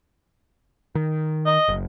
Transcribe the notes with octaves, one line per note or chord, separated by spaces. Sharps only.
D#3
D#5
F#1